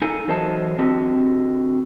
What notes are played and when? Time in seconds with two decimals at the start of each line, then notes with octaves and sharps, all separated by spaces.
0.02 D#4 A4 G#5
0.28 E2 F#3 A4 C5 D#5 A5
0.79 D3 C4 F#4 G4 D#5